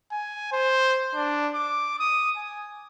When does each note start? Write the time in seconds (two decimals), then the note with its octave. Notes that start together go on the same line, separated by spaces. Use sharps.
0.12 G#5
0.52 C5
1.15 D4
1.54 D6
1.99 D#6
2.36 G#5